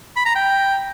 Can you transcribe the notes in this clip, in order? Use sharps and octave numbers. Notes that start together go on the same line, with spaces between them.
B5
A#5
G5